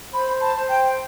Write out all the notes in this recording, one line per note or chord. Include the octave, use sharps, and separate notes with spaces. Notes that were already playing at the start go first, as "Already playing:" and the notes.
C5 B5
A5
C5
G5